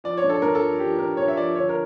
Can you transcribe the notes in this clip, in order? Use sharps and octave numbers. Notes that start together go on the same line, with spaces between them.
F3 D5
C#5
G2
A4
G2 A#4
A4
F3
F3 G4
G2 A#4
G2 C#5
E5
F3 D5
D2 C#5
A#4